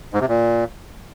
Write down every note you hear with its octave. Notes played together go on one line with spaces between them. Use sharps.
G#2
C3
A#2